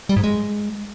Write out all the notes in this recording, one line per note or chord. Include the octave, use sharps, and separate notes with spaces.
G3
G#2
G#3